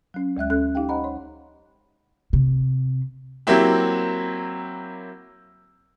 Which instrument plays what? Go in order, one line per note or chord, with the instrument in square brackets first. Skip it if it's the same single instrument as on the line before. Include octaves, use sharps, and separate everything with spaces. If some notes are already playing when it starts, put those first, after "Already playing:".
[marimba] F#3 C#4
D2 G#3 E5 F#6
D2 C#4 A4 F#6
D#4 G4 F5 G5
C5 D#5 F#5 A#5 B5
C#5 C6
[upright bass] C3
[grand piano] F#3 A#3 C4 E4 G4